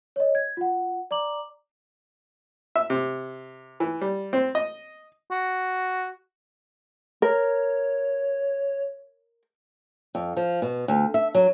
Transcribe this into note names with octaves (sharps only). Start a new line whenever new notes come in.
C#5 D#5
G#6
F4 F#5
D5 A#5 D6 F#7
E5
C3
E3
G3
C4
D#5
F#4
A#4 C#5
F2
F3
B2
D2
E5
F#3